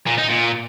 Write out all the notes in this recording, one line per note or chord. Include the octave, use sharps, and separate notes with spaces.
A#2
D#4
A#2